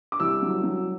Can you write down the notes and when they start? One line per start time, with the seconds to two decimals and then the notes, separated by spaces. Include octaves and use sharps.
0.12 D6
0.20 C2 E6
0.42 F#3
0.64 F#3